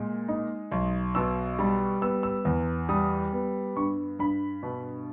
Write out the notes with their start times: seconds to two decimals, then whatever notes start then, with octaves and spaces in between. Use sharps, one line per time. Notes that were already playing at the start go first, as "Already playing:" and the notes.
Already playing: A#2 G#3
0.28 D#4
0.71 B1
1.15 B2 E6
1.59 G3
2.02 B3 E6
2.23 E6
2.45 E2
2.89 G3 D#6
3.33 B3
3.76 G2 C#6
4.19 G2 B5
4.63 B2